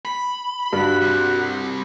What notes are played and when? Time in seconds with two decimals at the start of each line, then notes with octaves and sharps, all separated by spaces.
0.05 B5
0.73 G2 F#4
1.01 C3 G3